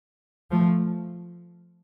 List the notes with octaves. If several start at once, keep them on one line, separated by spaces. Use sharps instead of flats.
F3 A3